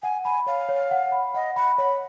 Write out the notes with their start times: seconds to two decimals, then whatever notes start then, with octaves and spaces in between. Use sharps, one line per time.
0.03 F#5 G#5
0.24 G#5 B5
0.47 C#5 F5
0.69 C#5
0.91 F#5
1.12 B5
1.34 D#5 F#5
1.56 F#5 B5
1.78 C#5 B5